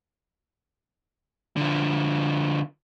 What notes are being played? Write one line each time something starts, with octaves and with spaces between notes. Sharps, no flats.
D3 F3